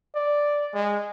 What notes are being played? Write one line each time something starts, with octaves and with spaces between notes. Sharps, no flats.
D5
G#3